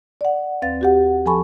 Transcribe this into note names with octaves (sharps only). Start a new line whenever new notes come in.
D5 F#5
D#2 C4 B4 F5 A6
F#4 G4 F#5
F3 A4 G#5 A5 B5 C#6